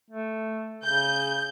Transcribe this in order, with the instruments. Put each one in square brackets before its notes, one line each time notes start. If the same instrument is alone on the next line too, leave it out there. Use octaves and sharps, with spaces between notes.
[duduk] A3
[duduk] C#3 [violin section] G6